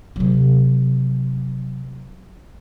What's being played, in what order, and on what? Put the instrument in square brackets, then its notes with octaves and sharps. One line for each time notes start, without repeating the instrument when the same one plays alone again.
[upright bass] C3 F#3